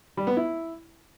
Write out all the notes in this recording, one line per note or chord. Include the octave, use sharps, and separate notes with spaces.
G3
B3
E4